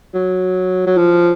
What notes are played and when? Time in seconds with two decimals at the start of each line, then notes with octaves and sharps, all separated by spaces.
0.14 F#3
0.87 F#3
0.97 F3